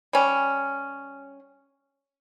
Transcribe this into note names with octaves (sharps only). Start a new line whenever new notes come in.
G3 C#4